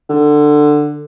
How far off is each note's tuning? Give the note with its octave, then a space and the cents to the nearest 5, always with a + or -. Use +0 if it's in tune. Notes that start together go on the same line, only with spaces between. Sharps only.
D3 +15